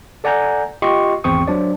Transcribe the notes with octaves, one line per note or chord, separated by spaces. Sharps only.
A4 D5 F#5 G#5 A#5 G6
F4 G4 D#5 C6 C#6
G#1 E2 C4 C5 C#6 D#6
F#3 D4 C5 D5